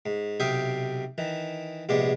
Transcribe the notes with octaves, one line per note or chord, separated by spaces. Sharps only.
G#2
B1 C3 E5 F5 G5 D#6
D#3 E3
A#1 C3 G#3 B3 D5